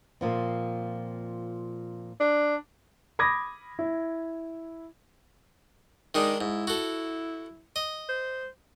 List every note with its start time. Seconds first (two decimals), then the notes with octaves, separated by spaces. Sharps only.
0.21 A#2 F3 C4
2.20 D4
3.19 B5 D6 D#6 G#6 A#6
3.79 E4
6.15 D#3 G#3 D4 D#4
6.41 G#2 E4
6.67 F#4 A4
7.76 D#5
8.09 C5